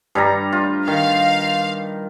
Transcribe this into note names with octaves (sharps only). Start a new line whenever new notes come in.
G2 G3 A#5
F4
D#3 F5